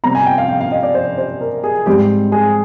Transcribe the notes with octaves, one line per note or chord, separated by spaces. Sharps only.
C3 G3 C4 A#5
G#5
G5
F5
G5
F5
D#5
D5
C5
C5
A#4
G#4
G#2 G3 C4 G4
G#4